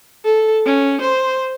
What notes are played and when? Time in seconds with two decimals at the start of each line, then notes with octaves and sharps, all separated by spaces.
0.25 A4
0.66 C#4
1.01 C5